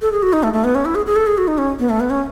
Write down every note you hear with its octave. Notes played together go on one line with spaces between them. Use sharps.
A4
G#4
F#4
D#4
A3
A3
B3
C#4
E4
G#4
G#4
A4
G#4
F#4
D#4
C#4
B3
A3
B3
C#4